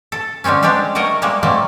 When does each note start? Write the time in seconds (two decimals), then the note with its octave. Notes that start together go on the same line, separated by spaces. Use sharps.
0.12 A4
0.44 D3 G3 G#3 C4 C#4
0.63 G3 G#3 C4 D4 G4
0.95 F#3 A3 A#4 C#5 D#5
1.22 G3 G#3 A#3
1.43 F#3 G3 A3 A#3 C4